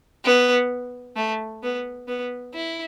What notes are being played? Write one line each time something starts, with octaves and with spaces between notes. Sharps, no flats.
B3
A3
B3
B3
E4